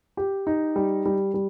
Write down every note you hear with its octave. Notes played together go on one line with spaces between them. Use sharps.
G4
D#4
G3
G3
G3